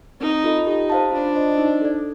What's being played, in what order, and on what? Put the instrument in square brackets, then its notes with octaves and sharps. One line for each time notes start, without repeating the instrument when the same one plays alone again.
[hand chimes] C4 [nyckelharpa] D#4
[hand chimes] F4 A4 D#5
[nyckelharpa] D#4 [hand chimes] G4
[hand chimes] C5 F5 A5
[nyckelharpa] D4 [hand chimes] F4
[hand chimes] C5 D#5
D#4
A4 D5